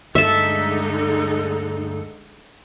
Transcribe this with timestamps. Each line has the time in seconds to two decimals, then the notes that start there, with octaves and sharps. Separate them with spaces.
0.15 D2 G2 D3 G#3 D#4 A4 E5 A5